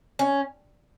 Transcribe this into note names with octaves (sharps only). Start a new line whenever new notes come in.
C#4